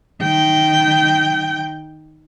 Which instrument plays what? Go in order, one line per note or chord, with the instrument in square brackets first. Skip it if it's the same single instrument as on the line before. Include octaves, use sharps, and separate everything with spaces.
[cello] D#3 G5